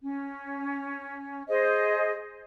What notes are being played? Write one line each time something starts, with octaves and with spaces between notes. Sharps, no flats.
C#4
G#4 C5 D#5